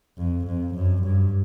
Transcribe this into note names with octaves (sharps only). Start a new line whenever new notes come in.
F2
F2
F#2
G2